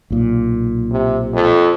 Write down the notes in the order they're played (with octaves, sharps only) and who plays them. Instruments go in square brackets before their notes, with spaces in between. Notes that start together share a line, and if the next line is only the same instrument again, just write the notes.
[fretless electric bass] B1 A#2
[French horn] C3
F2